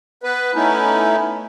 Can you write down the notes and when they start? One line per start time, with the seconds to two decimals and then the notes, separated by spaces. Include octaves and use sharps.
0.23 B3 B4
0.55 A3 B3 C#4 D#4 E4